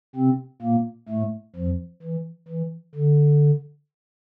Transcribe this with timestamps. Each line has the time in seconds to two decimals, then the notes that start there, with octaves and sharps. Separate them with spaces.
0.15 C3 C4
0.62 A#2 A#3
1.09 A2 A3
1.55 F2 F3
2.03 E3
2.48 E3
2.95 D3